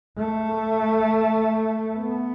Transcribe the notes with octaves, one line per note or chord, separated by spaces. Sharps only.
A3
B3